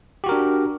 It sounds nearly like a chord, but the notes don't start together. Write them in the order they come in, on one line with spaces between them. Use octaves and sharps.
G4 F#4 A#4 D4